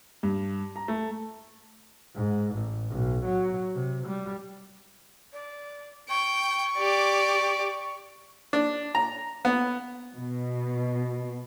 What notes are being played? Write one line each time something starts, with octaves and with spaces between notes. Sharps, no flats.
G2
A#5
A3
G#2
A1
B1
F#3
C3
G3
D5
G5 C#6
G4 D5
D4
A#5
B3
B2